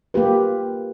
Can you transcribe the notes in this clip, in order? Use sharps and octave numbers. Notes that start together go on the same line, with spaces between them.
A#3 F4 G4 B4